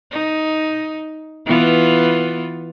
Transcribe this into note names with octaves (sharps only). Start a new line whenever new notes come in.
D#4
E3 B3 F4